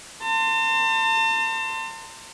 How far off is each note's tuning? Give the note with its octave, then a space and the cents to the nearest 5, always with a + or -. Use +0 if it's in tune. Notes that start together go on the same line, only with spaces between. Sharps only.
A5 +40 C6 -10